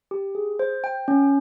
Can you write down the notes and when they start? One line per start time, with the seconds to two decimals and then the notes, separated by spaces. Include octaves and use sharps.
0.11 G4
0.35 G#4
0.59 C5
0.84 G5
1.08 C#4